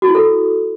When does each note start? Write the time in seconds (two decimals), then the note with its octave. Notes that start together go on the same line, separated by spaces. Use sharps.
0.02 F#4
0.08 E4
0.15 A4